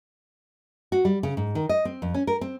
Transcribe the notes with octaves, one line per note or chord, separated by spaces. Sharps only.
F#4
G3
C#3
G#2
D#3
D#5
C4
F2
C#4
A#4
C4